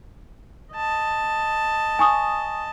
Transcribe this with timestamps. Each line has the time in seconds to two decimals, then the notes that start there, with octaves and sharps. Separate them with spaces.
0.75 D#5 A5
1.99 G#5 C#6 D#6